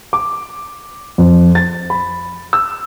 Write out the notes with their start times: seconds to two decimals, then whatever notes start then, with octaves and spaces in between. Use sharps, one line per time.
0.13 D6
1.18 F2
1.55 A6
1.90 B5
2.53 E6